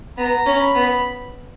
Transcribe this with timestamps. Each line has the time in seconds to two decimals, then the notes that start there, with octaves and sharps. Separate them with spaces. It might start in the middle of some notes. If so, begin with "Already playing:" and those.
0.17 B3 A#5
0.46 C#4
0.60 B5
0.75 B3